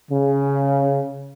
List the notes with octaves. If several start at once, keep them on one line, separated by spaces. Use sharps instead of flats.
C#3